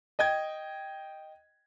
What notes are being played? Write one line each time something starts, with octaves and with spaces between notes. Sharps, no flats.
D#5 G5 G#6